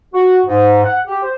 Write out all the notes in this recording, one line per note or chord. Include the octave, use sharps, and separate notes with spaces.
F#4
G#2
F#5
G4
C5